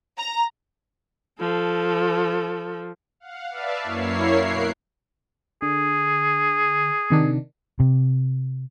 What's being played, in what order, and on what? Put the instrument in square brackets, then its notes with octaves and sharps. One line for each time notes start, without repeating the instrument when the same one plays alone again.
[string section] A#5
[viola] F3 A4
[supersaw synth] F5 F#5
B4 D5 E5 F5 A5
F#2 A#3 E4 C#5 C7
B2 A#4 F#6 C7 D7
[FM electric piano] D3 [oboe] G#4
[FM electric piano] C3 D#3 D4
[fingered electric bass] C3